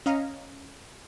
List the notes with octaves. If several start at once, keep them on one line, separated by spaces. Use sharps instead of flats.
C#4 D#5 F5 A#5